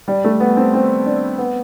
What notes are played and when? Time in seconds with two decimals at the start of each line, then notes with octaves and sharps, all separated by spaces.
0.08 G3
0.24 A3
0.40 B3
0.57 C4
0.74 C4
1.05 D4
1.38 B3